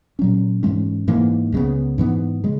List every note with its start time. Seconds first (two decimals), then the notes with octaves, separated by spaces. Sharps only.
0.19 A#2 F#3 C#4
0.63 G#2 E3 G#3 C#4
1.08 G#2 E3 A#3
1.52 C#2 C#3 G#3 B3
1.98 G#2 E3 B3
2.44 C#3 G#3